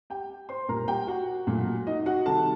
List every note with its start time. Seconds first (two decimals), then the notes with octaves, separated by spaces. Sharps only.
0.10 G4 G5
0.49 C5 C6
0.69 A#2 G3 A#3 A#4 A#5
0.88 G4 G5
1.07 F#4 F#5
1.47 A#2 F#3 A3
1.87 D#4 D#5
2.06 F#4 F#5
2.26 C3 D#3 G3 A4 A5